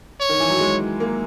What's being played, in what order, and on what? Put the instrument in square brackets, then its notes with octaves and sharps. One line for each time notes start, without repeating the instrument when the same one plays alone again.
[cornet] C#5
[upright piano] D#3
E3
F#3
G#3
A#3